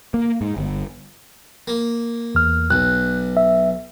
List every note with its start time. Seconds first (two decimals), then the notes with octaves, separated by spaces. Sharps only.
0.14 A#3
0.41 G#2
0.57 G1
1.68 A#3
2.35 E2 F6
2.70 B1 F#6
3.37 E5